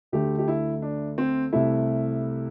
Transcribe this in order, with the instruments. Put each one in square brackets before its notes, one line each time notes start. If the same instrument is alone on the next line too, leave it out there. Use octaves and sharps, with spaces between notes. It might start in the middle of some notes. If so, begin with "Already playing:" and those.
[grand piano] D2 D3 A3 G4
G4
E4
D4
C4
C2 C3 A3 E4